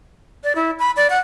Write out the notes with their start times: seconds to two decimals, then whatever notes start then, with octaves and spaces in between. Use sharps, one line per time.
0.44 D5
0.55 E4
0.79 B5
0.97 D5
1.10 F#5